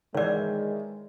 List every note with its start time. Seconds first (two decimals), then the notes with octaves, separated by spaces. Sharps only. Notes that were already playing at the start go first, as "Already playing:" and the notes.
0.15 D#3 E3 G#3 C#5 D5